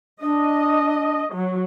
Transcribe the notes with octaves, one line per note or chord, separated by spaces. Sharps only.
D4 D#5
F#3